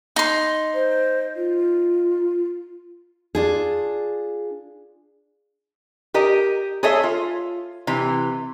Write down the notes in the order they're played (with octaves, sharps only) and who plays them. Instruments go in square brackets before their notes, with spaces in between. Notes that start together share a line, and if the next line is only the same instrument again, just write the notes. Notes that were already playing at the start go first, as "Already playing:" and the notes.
[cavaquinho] D#4 C6
[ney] C5
F4
[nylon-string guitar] D4 F4 G#4
[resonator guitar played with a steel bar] G4 A#4 D#5
G#4 A4 C#5 D#5 E5
F4
C3 E3